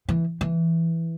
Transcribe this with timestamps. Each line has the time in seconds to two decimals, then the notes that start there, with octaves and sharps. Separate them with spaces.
0.09 E3
0.41 E3